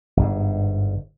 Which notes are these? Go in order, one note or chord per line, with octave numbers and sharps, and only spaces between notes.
G1 G#2